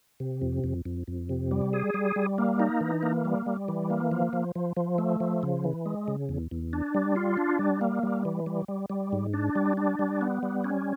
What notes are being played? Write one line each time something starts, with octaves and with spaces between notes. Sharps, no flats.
C3
F2
F2
F2
F2
C3
G3
G#4
G3
G3
A#3
D#4
E3
A#3
G3
G3
E3
A#3
F3
F3
F3
F3
A3
F3
C#3
E3
G#3
C#3
E2
E2
D4
G3
F4
D4
G3
A#3
G3
E3
G3
G3
G3
G#2
D4
G3
D4
G3
B3
G3
C#4